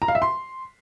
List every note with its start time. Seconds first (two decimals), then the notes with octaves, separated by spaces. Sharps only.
0.02 A#5
0.08 F5
0.15 E5
0.22 C6